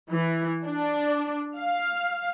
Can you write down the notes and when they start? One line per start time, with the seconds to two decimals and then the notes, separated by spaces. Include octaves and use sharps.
0.10 E3
0.65 D4
1.57 F5